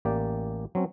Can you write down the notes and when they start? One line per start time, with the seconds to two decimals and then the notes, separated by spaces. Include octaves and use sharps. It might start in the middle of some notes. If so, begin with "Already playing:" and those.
0.05 A1 A#3 G4 D5
0.75 F#3 C4 C#4